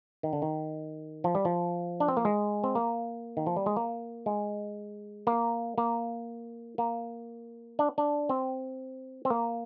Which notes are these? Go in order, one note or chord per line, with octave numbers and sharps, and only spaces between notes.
D#3
D3
D#3
F3
G3
F3
D4
C4
A#3
G#3
C4
A#3
D#3
F3
G3
G#3
A#3
G#3
A#3
A#3
A#3
D4
D4
C4
C4
A#3